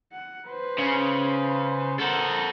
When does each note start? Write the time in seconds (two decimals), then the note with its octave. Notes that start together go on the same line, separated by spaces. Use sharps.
0.12 F#5
0.49 B4 C5
0.78 C#3
2.00 A4 A#4 C5 F#5